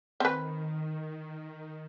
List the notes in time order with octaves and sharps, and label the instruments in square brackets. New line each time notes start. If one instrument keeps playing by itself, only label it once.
[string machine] D#3 [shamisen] C4 B4